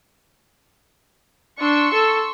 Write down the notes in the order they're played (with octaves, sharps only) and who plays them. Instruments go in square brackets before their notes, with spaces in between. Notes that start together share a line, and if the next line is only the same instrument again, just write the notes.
[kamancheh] D4 [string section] C6 C#6 E6
[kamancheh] A4